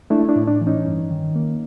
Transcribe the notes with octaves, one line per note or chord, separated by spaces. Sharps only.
A3 D4 E4
D4 E4
A2
D4
E3
C#4 D#4
G2
D#3
A#3